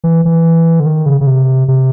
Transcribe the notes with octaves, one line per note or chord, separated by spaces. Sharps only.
E3
E3
D3
D#3
C#3
C#3
C3
C3